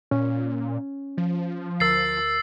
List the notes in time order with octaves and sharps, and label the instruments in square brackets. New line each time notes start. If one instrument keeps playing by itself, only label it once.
[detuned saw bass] A#2 [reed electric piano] C#4
[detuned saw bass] F3
[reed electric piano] D2 A#4 [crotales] E6 A6 C7